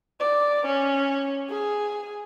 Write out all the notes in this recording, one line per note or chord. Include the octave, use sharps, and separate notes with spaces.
D5
C#4
G#4